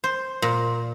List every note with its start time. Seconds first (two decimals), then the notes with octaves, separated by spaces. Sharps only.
0.04 C5
0.42 A#2